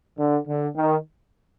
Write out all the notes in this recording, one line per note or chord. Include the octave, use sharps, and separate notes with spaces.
D3
D3
D#3